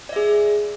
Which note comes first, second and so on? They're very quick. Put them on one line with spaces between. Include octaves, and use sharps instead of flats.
D5 E5 G#4